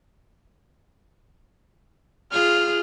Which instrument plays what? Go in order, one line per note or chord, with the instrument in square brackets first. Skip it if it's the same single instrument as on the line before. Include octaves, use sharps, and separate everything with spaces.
[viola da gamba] F4 G#4 [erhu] F6